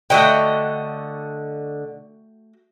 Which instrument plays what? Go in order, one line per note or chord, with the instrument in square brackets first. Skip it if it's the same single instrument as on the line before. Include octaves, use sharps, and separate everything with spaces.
[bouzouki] D3 D#5 [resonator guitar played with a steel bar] A3 F#4 G5